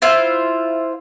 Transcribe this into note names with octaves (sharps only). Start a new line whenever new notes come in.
E4 F4 C5